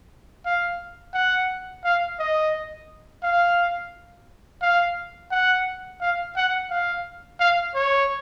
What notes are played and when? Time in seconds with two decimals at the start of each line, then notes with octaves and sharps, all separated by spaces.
0.46 F5
1.14 F#5
1.84 F5
2.19 D#5
3.23 F5
4.62 F5
5.31 F#5
6.01 F5
6.36 F#5
6.71 F5
7.40 F5
7.75 C#5